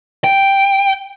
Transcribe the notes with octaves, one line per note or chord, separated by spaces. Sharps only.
G5